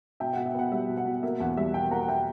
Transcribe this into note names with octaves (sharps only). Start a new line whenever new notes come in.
B2 E5 G5
B2 F#5
E5
B3 F#5
G3 E5
B2
F#5
B2
A#3 E5
E2 F#5
G3 E5
B2 E5 G5
A#3 F#5 A#5
F#5
E5 G5